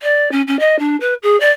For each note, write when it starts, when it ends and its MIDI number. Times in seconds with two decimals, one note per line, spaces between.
0.02 0.31 74
0.32 0.42 61
0.47 0.59 61
0.59 0.79 75
0.79 0.96 62
1.00 1.14 71
1.23 1.38 68
1.40 1.51 74